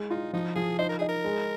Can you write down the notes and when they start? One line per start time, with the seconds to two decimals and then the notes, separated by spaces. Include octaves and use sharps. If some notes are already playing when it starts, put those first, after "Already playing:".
Already playing: G#3
0.10 D#4 F4
0.33 F3 D#4
0.56 F3 G#4
0.79 D#4 C5
0.89 A#4
0.99 D#4 G#4
1.09 A#4
1.24 G#3